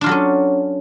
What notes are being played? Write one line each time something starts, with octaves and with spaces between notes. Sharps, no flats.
F#3 C#4 D4 F4 A4